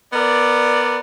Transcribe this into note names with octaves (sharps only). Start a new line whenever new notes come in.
B3 A#4 D5